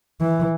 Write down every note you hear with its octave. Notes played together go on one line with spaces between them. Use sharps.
E3